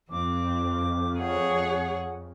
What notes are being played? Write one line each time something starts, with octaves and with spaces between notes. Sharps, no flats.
F2 C4 D6
G#4 C#5 F#5